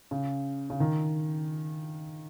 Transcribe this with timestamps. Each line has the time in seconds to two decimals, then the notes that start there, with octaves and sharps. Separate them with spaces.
0.11 C#3
0.70 C#3
0.80 D#3